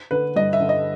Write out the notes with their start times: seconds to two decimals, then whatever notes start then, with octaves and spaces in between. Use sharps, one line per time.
0.11 D3 B4
0.36 G2 D#5
0.53 E5
0.61 D3
0.69 D#5